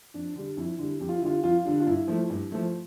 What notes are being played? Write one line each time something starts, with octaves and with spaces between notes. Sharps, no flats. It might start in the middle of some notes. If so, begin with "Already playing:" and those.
F2 D4
D3 G3
F2 E4
D3 G3
F2 G4
F4
E4
D3 G3 F4
F2 F4
D3 G3 D4
F4
G2 E4
F3 A3
G2
F3 A3